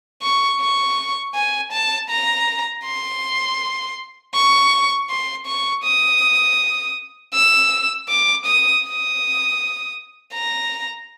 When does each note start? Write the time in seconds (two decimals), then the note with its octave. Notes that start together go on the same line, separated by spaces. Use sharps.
0.22 C#6
0.61 C#6
1.34 G#5
1.72 A5
2.10 A#5
2.85 C6
4.35 C#6
5.09 C6
5.46 C#6
5.83 D#6
7.34 E6
8.09 D6
8.45 D#6
8.84 D#6
10.33 A#5